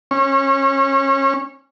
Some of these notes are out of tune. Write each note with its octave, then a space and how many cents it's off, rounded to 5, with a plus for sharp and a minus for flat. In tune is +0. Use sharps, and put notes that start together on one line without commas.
C#4 -25